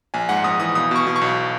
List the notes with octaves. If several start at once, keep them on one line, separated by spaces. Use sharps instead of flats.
A#1 G#5
G#2 F#5
A#1 D#6
E3 D#6
B1 D#6
B2 C#6
B2
C#6
B1